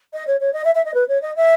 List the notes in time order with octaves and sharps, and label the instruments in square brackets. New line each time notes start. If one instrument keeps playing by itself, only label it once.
[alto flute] D#5
C#5
C#5
D#5
E5
E5
D#5
B4
C#5
D#5
E5